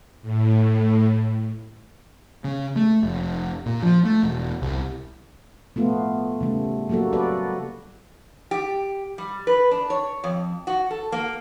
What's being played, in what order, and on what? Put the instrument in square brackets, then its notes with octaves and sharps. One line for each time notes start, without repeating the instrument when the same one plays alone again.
[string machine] A2
[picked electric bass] C#3
A3
F1
A#2
F3
A3
E1
C2
[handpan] A3 B3 F4
C#3 G3 A3
F#3 G3 A#3 F#4 A4
F#4 A4 B4 D5
[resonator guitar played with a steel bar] G4
G3
B4
D4
C#5
F2
F#4
A4
A#3